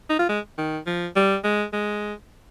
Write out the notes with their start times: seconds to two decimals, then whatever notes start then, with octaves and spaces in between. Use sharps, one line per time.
0.09 D#4
0.19 F4
0.29 G#3
0.58 D#3
0.87 F3
1.16 G3
1.44 G#3
1.73 G#3